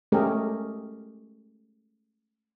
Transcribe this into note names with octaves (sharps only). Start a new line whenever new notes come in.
G#3 A3 C#4 G4 G#4 A#4